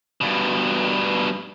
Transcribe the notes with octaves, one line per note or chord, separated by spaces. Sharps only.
G2 B2